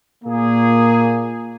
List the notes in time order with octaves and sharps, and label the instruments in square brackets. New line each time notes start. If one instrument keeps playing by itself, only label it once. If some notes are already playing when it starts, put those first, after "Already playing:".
[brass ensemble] A#2 A#3 G#4